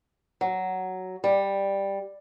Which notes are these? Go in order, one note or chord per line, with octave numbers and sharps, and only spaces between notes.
F#3
G3